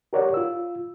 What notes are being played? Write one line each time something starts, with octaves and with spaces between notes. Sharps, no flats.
G4 A#4 C#5 D5 F#5
F4 E6